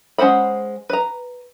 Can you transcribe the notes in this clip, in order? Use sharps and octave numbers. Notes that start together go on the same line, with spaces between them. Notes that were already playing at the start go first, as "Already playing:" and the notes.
G#3 C#4 C5 F#5 B5
B4 A#5